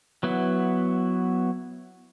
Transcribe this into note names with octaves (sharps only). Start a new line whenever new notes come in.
F#3 B3 E4